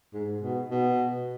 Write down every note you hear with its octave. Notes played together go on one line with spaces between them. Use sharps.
G#2
B2
B2